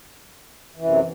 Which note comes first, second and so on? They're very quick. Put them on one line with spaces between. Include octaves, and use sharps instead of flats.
E3 F#2 C3